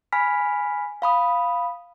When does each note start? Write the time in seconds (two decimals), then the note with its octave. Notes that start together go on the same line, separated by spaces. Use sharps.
0.12 G#5 B5 F6 B6
1.02 F5 B5 D#6